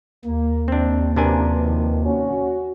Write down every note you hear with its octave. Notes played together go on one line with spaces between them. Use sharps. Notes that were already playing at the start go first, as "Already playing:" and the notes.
D#2 A#3
C3 D#3 C4 D4
F#2 C3 F3 D4 A#4 B4 G#5
D#3
C#4 F#4